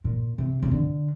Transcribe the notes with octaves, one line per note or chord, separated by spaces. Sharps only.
A#2
C3
C3
D3